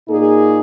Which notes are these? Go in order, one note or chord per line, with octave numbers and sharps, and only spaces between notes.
A#2 A#3 D#4 G#4